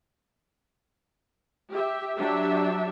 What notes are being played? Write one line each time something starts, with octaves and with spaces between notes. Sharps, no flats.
G4 E5
F#3 D4 G4 E5